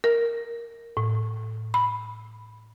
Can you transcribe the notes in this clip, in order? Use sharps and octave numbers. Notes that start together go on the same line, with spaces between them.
A#4
A2
B5